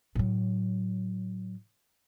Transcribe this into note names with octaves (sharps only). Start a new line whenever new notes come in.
A2 F#3